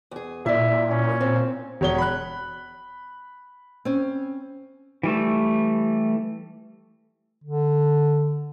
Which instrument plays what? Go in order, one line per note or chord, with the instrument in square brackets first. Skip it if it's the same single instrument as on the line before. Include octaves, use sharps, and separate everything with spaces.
[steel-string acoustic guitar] E2 G#4
[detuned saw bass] A#2 [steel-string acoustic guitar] E4 D5 [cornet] E5
[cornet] C#4
[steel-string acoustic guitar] C4
[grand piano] E1 C#5 G7
B5 F#6
[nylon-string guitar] C4 C#4
[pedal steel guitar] E3 G3 A3
[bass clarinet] D3